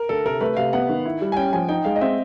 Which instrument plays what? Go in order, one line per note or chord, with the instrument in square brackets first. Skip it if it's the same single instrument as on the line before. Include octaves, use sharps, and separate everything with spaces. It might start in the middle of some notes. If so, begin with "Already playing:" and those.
Already playing: [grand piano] A#4
[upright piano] D2 [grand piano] A4
[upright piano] C3 [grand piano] A#4
[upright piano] A3 [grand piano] B4
[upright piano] C3 [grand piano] F5
[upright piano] B3 [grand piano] F#5
[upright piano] D#3
E4
G3
[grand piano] G#5
[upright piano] C#4 [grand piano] G5
[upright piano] F3 [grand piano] G#5
[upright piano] D#4 [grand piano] G5
[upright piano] G#3 [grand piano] F5
[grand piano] D#5
[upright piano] C4 [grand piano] E5